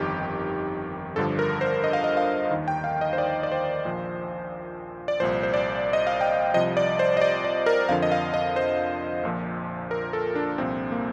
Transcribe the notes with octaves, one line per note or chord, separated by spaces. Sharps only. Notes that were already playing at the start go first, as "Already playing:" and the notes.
Already playing: G1 F2 D#3 G4
G1 G2 D3 F3 A4
A#4
C5
D#5
F5
D#5
F5
D#2 D#3
G5
F5
D#5
C5
D5
D5
C5
A#1 A#2 F3
D5
C2 A#2 F3 C5
C5
D5
D#5
F5
G5
C2 C3 F3 D#5
D5
C5
D#5
D5
D5
A#4
F2 D3 F3 F5
D#5
F5
D#5
C5
A#1 A#2 F3
A#4
A4
D4
C2 A#2 F3 C4
A#3